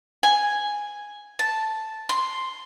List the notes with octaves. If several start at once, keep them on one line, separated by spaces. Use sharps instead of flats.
G#5
A5
C6